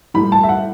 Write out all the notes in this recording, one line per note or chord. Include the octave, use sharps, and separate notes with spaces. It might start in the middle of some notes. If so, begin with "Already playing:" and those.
A2 G3 B5
A5
E5
F#5